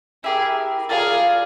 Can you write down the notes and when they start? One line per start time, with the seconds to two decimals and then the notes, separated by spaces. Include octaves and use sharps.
0.24 E4 G4 G#4 A#4
0.89 F4 G#4 A#4 D5 F5